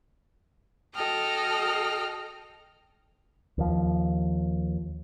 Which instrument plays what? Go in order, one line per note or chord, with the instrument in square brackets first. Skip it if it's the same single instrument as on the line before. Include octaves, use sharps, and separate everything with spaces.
[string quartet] F#4 A4 D#5 G5 F6
[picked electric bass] D#2 F3